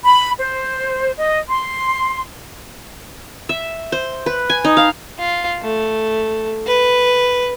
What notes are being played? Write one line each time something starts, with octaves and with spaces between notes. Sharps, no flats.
B5
C5
D#5
C6
E5
C5
B4
G#5
D#4
F5
F4
A3
B4